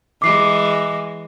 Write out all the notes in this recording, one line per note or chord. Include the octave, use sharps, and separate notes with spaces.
E3 G#3 D6 C7